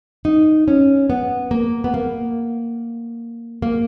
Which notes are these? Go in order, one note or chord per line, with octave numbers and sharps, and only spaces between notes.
D#4
C#4
B3
A#3
B3
A#3
A#3